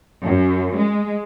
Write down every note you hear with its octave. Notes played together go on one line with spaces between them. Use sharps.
F#2
G#3